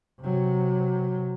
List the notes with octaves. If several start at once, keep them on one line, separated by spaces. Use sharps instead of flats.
C3 F#3